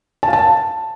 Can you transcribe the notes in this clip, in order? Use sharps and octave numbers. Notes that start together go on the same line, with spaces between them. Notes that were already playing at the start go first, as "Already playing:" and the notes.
A5
F5
A5